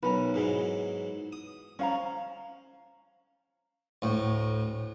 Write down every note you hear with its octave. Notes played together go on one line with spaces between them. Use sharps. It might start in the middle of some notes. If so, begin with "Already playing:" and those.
B1 C#4 A#4 B4
G#2 E3 F#3
D#6
F3 C#4 F5 A#5
D2 A2